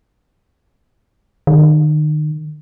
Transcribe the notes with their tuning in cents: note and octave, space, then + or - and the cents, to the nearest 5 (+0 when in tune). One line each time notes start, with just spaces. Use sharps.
D#3 -35